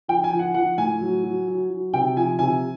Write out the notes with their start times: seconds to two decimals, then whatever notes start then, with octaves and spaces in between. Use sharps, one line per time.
0.08 F3 G5
0.24 G#5
0.32 F3
0.39 F#5
0.54 F3 F#5
0.78 A2 G#5
1.01 F#3
1.24 F#3
1.47 F#3
1.70 F#3
1.93 C3 G5
2.17 F3 G#5
2.39 C3 G#5